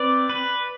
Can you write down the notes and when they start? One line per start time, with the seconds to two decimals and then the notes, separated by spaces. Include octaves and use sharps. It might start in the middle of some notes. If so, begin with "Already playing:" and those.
Already playing: C4 B4 D5
0.29 B4